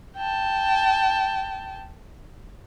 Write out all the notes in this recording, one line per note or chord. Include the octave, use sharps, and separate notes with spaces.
G5 A5